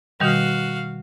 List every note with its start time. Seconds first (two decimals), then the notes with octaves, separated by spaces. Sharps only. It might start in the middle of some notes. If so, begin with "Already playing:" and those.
0.20 B2 D#3 G3 F#4 F5